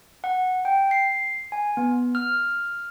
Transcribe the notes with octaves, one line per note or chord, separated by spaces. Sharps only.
F#5
G5
C7
G#5
B3
F6